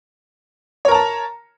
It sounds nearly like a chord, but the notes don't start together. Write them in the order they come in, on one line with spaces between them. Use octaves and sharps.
C#5 A#4 A#5 A5